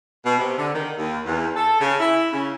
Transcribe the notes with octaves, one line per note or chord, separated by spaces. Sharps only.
B2
C3
D3
D#3
D#2
E2
A4
C#3
E4
C#3